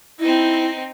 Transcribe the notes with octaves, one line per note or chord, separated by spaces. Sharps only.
C4 D#4 E4